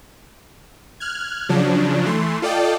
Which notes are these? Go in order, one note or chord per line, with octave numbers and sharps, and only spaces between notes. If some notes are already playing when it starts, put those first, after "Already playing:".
F6 F#6 G#6
C#3 F3 F#3 D4
E3 A3 C6
F4 A4 D5 D#5 G5 A5